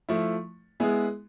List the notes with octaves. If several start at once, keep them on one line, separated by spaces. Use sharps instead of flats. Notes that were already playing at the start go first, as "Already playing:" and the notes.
F3 A3 E4
G#3 B3 E4 G#4